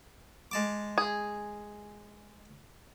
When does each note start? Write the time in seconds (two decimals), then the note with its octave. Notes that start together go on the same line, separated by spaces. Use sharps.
0.51 G#3 A5 D6
0.98 G#4